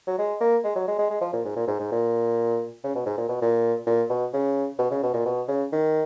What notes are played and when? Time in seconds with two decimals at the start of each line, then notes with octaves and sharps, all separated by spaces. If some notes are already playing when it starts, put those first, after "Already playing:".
0.07 F#3
0.18 G#3
0.41 A#3
0.64 G#3
0.76 F#3
0.88 G#3
0.99 G#3
1.10 G#3
1.21 F3
1.33 A#2
1.45 G#2
1.56 A#2
1.68 G#2
1.80 G#2
1.92 A#2
2.84 C#3
2.95 B2
3.06 G#2
3.17 A#2
3.29 B2
3.41 A#2
3.87 A#2
4.10 B2
4.34 C#3
4.79 B2
4.91 C#3
5.03 B2
5.14 A#2
5.26 B2
5.48 C#3
5.72 D#3